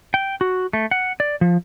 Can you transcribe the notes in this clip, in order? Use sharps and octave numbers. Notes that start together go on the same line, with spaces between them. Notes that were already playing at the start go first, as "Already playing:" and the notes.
G5
F#4
A3
F#5
D5
F3